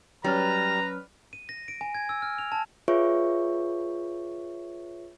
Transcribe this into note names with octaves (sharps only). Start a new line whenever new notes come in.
F#3 G3 C#4 B4 A#5 F6
D#7
A#6
D7
G#5
G#6
E6
F6
F7
A5
F4 G#4 B4 C#5 E5 C#6